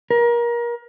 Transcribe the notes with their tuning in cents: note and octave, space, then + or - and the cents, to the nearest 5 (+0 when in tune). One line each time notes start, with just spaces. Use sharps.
A#4 +30